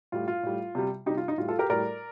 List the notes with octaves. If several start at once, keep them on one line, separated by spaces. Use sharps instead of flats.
A2 G3 F4
F4
A2 G3
C3 G3
C3 G3 D#4 G4
F4
D#4
A2 G3 F4
F4 A4
G4 A#4
A2 G3 A#4 D5